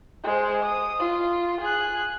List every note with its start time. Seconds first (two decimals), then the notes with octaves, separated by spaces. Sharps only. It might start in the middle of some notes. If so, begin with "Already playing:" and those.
0.24 G#3 C5
0.62 D#6
0.99 F4
1.61 G#4 F#6